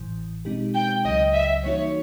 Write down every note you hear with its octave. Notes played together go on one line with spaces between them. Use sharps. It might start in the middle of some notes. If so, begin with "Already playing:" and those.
Already playing: A1 A2 E3
B2 G#3 C4 D#4 G4
G5
C#2 C#3 F#3 D#5
E5
E3 G3 A#3 D#4 F#4 C#5